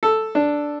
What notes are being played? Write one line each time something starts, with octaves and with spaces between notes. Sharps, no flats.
A4
D4